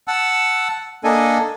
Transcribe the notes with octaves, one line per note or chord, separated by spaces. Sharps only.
F#5 A5 E6
A#3 D4 A4 D#5 G#5